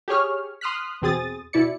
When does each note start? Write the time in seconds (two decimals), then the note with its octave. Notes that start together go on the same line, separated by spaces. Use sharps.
0.08 G4 G#4 C#5 F6
0.61 C6 D#6 F6 F#6 B6
1.02 E2 B2 C4 G#4 D#6 A6
1.53 B2 E4 D5 C#7